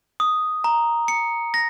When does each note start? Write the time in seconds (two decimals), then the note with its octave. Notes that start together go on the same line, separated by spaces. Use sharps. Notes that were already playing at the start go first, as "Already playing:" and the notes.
0.20 D#6
0.64 A#5
1.08 C#7
1.54 A#6